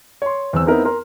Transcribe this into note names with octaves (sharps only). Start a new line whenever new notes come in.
C#5 C6
E2 C4 E6
B3 C4 D#4 E4 A#4 B4
A#4 C6